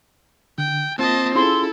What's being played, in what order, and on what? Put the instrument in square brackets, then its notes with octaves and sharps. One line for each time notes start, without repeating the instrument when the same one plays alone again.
[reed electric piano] D3 [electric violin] G5
[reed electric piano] A#3 F4 [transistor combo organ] C4 [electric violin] D#5 A5
[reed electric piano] C#4 F4 G#4 [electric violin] E4 A4 [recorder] C6